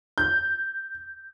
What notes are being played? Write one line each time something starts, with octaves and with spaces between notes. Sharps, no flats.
G6